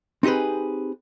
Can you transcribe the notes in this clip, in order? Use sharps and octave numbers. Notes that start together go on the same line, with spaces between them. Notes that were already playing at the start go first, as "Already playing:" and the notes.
C4 D#4 G4 G#4 B4